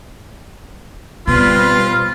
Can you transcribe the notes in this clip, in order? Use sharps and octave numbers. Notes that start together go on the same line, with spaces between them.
B2 G3 C4 F4 B4 C6 F6